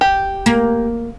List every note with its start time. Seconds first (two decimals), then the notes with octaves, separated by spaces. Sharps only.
0.01 G4
0.46 A#3